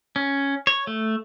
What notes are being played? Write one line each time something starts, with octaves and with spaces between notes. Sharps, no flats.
C#4
C#5
A3